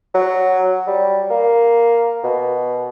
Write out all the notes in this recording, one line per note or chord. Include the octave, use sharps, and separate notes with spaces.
F#3
G3
A#3
B2